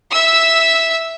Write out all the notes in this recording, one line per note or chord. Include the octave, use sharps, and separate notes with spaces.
E5 E6